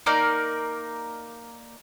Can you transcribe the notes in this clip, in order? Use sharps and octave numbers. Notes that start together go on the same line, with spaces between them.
A#3 D#4 A#4 D5